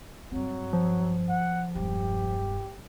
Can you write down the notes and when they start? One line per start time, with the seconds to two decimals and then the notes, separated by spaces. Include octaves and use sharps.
0.31 G2 F#3 C4
0.73 F3
1.29 F#5
1.75 E1 G2 G4